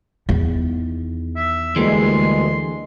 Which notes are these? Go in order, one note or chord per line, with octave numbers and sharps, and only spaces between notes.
E2 D#3
E5
D2 E3 G3 G#3 A#3 C6